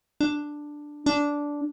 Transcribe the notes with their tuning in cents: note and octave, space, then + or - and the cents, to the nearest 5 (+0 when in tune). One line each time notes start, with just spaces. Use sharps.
D4 +5
D4 -10